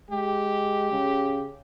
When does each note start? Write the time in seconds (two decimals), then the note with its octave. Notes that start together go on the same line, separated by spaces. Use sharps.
0.11 G#3 G4
0.92 C#3